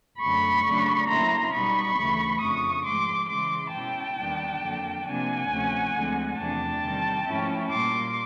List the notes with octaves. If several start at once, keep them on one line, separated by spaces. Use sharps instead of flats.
F#2 D3 F#3 A3 B5 C#6
C#3 F#3 A3 D4
D3 F#3 A#3 C#4 E4 A#5 C6
B2 G3 B3 D#4 B5 C#6
D2 C#3 E3 A3
F2 C#3 F3 A3 D4 C#6 D#6
G#2 F3 G#3 C6 D6
C#3 E3 G#3 C6 D6
B2 G#3 C#4 E4 G5 A5
D#2 D#3 G3 B3 D4
F2 D3 F#3 A#3
C3 F3 A#3 D4 F#5 G#5
D2 C3 F3 A3 C#4
D2 D3 F3 G#3 C4
E2 C3 F3 A3 D4 G5 A5
C3 D#3 G3
G#2 F3 A3 C#4 E4
A#2 G3 A#3 C6 D6